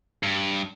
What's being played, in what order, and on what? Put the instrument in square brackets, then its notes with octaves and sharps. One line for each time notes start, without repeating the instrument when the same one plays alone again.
[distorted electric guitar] G2